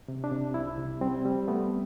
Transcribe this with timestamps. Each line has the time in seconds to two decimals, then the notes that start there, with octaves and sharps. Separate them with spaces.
0.08 C3
0.24 D4
0.31 C3
0.54 C2 E4
0.78 C3
1.01 G3 C4
1.25 G3
1.48 A3 B3